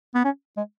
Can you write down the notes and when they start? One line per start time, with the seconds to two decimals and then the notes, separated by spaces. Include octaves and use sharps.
0.15 B3
0.24 C#4
0.57 G#3